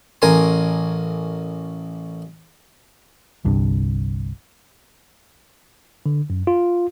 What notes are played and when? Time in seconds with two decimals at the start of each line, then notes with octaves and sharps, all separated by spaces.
0.22 A1 A#4 G#5 C6
3.45 G1 C2 G2
6.06 D3
6.30 F#2
6.47 F4